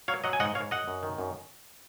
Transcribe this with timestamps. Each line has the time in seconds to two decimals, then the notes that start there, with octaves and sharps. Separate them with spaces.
0.08 F#3 C#5 F5
0.24 F#3 D#5 F#5
0.33 G#5
0.40 G#2 D#5 F#5
0.55 G#2 C#5 F5
0.71 F#2 D#5 F#5
0.88 F#2
1.03 D#3
1.18 F#2